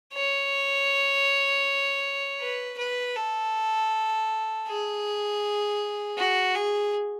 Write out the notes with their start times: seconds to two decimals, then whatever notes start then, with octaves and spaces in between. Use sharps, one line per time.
0.14 C#5
2.40 B4
2.78 B4
3.16 A4
4.67 G#4
6.18 F#4
6.55 G#4